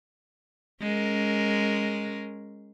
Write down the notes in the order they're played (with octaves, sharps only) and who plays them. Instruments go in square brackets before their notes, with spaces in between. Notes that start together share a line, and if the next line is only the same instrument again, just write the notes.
[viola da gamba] G#3 C#4 A#4